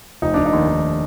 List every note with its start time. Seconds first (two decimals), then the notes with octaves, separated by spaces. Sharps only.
0.22 F1 D#4
0.34 F1 D4
0.46 D#4
0.53 D#2
0.68 D#2